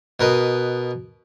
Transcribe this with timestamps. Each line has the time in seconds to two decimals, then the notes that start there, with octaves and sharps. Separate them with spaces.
0.20 B2 A#4 B4 D#5